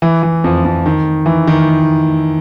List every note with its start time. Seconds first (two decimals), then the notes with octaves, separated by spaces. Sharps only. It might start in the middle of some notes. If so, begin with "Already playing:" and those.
0.02 E3
0.23 E3
0.44 F2 F3
0.65 F2 F3
0.86 D#3
1.26 E3
1.47 D#3